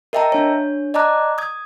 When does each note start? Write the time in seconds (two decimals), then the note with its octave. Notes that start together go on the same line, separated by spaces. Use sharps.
0.13 A#4 D#5 E5 G5 A5 A#5
0.32 D4 C#5
0.94 D5 D#5 A5 A#5 D6 F#6
1.38 D#6 G#6